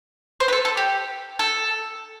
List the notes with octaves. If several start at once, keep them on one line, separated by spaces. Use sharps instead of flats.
C5
B4
A4
A4
G4
A4